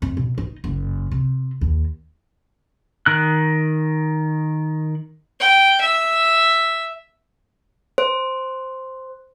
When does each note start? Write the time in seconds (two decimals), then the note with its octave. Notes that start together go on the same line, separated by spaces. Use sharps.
0.02 F2
0.17 B2
0.38 D#4
0.64 F#1
1.11 C3
1.61 D#2
3.06 D#3 F#6
5.40 G5
5.81 E5
7.98 C5